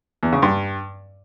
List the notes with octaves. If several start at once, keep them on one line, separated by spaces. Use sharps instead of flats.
E2
C#3
G2